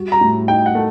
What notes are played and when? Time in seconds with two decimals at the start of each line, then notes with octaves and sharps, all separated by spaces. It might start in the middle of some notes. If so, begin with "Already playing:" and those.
Already playing: G3 F#4
0.12 A#5
0.21 A2
0.48 D#4 G5
0.66 F#5
0.75 A3